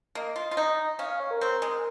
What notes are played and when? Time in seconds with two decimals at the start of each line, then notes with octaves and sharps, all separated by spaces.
0.15 A#3 D#5
0.36 F4
0.51 F4
0.57 D#4
0.99 C#4 F5
1.06 D#5
1.09 F5
1.20 C#5
1.31 A#4
1.41 C4
1.62 G#3